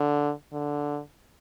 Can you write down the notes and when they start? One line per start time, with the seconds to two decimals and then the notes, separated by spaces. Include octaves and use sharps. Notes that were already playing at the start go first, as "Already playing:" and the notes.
Already playing: D3
0.52 D3